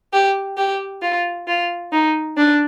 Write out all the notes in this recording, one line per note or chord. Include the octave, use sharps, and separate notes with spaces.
G4
G4
F4
F4
D#4
D4